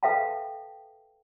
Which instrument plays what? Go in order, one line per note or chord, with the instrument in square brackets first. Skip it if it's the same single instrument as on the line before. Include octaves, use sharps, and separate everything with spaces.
[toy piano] A4 B4 E5 F5 G5 A5